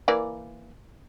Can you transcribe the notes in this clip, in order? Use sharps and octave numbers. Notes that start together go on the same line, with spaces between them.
E3 A#3 D5